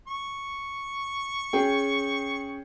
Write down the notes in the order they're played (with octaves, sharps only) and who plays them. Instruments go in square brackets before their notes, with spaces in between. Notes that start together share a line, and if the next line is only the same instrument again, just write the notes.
[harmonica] C#6
[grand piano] C#4 G#4 G5